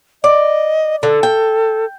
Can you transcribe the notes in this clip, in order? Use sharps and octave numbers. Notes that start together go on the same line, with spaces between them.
D5 D#5
D3 A4
G5